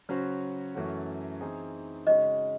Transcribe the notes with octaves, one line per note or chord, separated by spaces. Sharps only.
C#3 F#3 C#4 F#4 C5
F#2 E3 A3 C#4 F#4
E3 C4 D#4 G#4
C#3 G#3 C#4 F#4 D#5